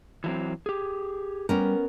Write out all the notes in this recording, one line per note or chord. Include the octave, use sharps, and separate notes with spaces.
E3 F#3 C4
G4 G#4
G3 B3 C#4 A#4